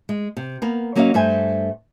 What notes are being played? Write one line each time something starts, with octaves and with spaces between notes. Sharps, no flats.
G#3
C3
A#3 B3 A#4
F#3 A#3 C#4 F#4 D#5 F5
G2 A3 C5 G#5